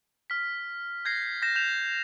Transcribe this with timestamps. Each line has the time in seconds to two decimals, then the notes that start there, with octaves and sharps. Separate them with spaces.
0.30 F6 B6
1.05 G6 G#6 A#6 C7
1.42 G6 A#6 E7
1.56 G6 E7 F7